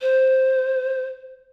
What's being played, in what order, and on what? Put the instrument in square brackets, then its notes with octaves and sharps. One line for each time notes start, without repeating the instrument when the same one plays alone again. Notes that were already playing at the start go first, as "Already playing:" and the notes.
[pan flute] C5